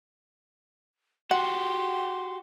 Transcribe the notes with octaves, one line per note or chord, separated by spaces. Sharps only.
F#4 G4 F#5 C6